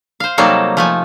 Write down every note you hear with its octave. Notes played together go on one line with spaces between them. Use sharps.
C5 F5
C3 F#3 G3 A#3 D#4 A4
F3 A3 G#5